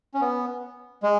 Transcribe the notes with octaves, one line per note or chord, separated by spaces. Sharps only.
C#4
B3
G#3